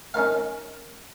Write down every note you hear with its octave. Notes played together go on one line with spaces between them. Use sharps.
C#4 D#4 A#4 F5